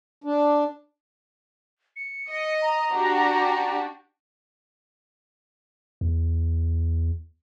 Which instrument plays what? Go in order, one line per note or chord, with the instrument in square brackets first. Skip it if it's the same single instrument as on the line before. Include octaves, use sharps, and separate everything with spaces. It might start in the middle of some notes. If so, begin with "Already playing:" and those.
[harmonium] D4
[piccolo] C#7
[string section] D#5
[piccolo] A#5
[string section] D4 F#4 G4
[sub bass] E2